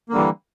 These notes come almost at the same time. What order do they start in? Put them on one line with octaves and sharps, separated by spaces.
A#3 D3 G3 E3